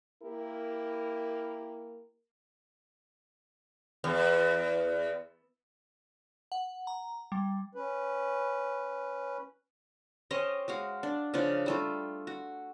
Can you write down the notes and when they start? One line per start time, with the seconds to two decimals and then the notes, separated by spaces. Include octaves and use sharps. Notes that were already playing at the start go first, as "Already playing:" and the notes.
0.23 A#3 E4 G4 A#4
4.04 E2
6.52 F#5
6.87 A#5
7.32 G3
7.75 C#4 B4
10.31 C#4 G4 C5 D#5
10.68 G#3 F#4 F5
11.03 D4
11.34 C#3 F3 D4 F4
11.66 G3 A3 F4
12.27 F#4